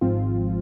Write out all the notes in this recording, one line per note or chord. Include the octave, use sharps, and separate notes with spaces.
G#1 G#2 F3 C4 F4